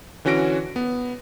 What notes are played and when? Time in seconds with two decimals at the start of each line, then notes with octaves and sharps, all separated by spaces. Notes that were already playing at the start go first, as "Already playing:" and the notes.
0.25 D3 E3 C#4 F#4 A#6 D7
0.76 B3